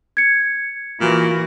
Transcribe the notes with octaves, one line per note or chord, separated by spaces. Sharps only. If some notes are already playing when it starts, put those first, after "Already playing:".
G#6 C#7
A#2 E3 F#4